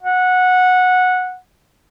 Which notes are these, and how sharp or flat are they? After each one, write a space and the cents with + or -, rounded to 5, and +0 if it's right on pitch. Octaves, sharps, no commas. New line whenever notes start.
F#5 -15